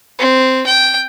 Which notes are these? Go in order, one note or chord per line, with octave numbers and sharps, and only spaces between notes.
C4
G5